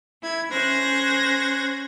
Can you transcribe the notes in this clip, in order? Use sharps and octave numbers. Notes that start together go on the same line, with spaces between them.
E4 G#6
C#4 C5 F#6 G#6 A#6